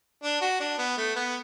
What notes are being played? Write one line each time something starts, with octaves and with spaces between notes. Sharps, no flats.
D4
F#4
D4
B3
A3
B3